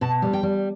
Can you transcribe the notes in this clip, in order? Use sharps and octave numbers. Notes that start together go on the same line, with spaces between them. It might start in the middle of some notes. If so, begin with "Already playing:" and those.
B2 A5
G3
G5
G3